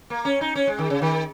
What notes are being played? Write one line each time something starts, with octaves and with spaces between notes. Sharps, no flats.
A#3
C#4
D#4
C#4
G#3
D#3
C#3
D#3